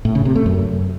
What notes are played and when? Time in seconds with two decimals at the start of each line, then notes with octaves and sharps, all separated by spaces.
0.05 A2
0.15 C#3
0.25 C3
0.35 A3
0.46 F#2